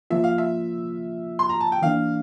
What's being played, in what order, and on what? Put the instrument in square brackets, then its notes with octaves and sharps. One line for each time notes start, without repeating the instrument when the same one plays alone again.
[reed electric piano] F3 A#3 F4 [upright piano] E5
[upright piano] F5
E5
C6
A#5
A5
G5
[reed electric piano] E3 A#3 D4 [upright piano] F5